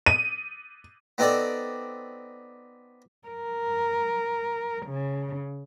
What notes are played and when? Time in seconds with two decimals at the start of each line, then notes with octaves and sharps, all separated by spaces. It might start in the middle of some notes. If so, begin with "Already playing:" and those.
0.06 D#7
1.18 B3 C4 D#4 A4 D5 A5
3.28 A#4
4.86 C#3